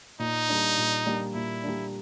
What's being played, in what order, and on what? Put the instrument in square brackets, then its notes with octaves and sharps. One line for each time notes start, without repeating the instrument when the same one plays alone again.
[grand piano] A#2 [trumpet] D#4
[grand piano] G3 A#3 D4
A#2
G3 A#3 D4
[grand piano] A#2 [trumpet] E4
[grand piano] G3 A#3 D4